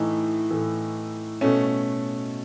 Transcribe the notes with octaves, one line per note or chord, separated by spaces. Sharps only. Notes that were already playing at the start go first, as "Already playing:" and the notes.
Already playing: A2 E3 A3 D#4
A2 E3 A3
B2 A3 C#4